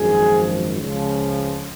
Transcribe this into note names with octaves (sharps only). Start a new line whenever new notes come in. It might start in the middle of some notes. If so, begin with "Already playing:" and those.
Already playing: G#1 F#2 F3 G#4
C#2 C#3 F3